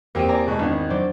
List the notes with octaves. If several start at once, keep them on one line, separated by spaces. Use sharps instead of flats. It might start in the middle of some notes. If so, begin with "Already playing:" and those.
E2 A#3 C4 G4 D#7
D5 G#5 A#5
B2 G#3
G#1 D#3 B3 D4
F#3 C5 D5